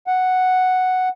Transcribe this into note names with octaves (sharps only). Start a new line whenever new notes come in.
F#5